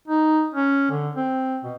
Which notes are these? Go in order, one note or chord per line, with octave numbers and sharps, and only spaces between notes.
D#4
C#4
D3
C4
B2